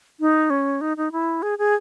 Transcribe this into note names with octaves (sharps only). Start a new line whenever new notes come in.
D#4
C#4
D#4
D#4
E4
G#4
G#4